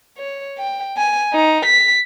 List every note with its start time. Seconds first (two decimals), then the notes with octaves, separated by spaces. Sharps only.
0.18 C#5
0.59 G5
0.97 G#5
1.33 D#4
1.66 B6